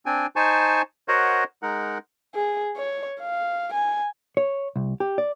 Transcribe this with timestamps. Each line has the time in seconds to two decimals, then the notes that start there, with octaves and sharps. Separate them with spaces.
0.06 C4 D4 G5 G#5
0.36 D#4 C5 G#5 A5 C#6
1.08 F#4 A#4 C5 C#5 D#5 F#5
1.63 G#3 D#4 A#4 F#5
2.35 G#4
2.76 C#5
3.21 F5
3.73 G#5
4.37 C#5
4.76 C2
5.00 G4
5.18 D5